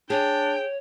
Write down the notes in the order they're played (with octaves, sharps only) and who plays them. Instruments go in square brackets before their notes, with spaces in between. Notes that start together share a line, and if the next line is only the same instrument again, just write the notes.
[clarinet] D4 [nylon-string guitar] G#4 [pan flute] C#5 [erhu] G5